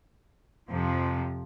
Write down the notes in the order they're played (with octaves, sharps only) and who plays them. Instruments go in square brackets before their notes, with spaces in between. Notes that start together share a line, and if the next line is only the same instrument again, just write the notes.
[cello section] F2 C3 F3